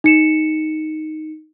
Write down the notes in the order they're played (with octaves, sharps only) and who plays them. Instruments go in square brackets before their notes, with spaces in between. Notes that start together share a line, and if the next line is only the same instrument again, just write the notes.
[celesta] D#4 C#7 E7